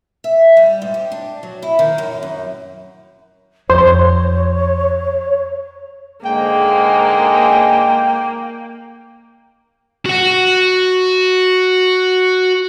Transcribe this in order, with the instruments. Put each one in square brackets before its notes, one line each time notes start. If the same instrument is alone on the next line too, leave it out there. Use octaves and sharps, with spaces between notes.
[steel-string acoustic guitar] E5
G3
G#2
G4
D4
F#3
E4
D#3
F#2
F#2
[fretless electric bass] F2 [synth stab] C5 [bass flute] C#5
[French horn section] G#2 D3 G#3 [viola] A#3 [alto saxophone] G5
[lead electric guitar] F#4 F#5